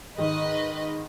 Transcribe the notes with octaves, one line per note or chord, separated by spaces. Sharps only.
G#2 D#3 B4 D#5